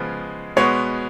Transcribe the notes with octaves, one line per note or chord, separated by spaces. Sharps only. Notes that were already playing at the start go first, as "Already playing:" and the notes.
Already playing: C#3 F3 G#3 B3
B2 G#3 B3 C#5